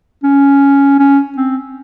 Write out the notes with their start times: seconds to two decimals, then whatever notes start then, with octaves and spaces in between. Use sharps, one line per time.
0.23 C#4
0.99 C#4
1.37 C4